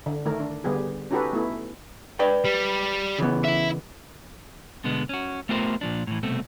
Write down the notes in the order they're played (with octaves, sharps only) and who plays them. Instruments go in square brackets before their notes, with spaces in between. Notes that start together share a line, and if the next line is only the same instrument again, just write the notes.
[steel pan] D3
D#3 A3 A#4
D4
D3 G3 B3 G4 G#4
C#4 D#4 F#4 G4 A4 B4
A3 B3 E4
[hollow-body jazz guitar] B4 D5 G5
[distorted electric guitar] G3
[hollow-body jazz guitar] C#3 E3 B3
[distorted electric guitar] E4 E5
[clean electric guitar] B2 D3 G#3 B3
C#4 F#4
A3 B3 F4 G4 A#4 C5
A#2 F3 D4
A2 E3
C2 B2 A3 C4